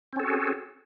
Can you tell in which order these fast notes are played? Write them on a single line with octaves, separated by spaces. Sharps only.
C4 C#4 A4 F#4 G#4